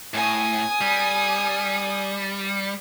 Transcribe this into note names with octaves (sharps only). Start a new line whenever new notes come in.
A2 G#5 D#6
G3